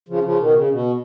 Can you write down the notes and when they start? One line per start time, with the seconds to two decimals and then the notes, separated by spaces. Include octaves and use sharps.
0.08 C#3 F3
0.23 C#3 F3
0.39 B2 D#3
0.55 C#3
0.71 B2